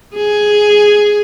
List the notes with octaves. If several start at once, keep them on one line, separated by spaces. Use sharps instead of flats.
G#4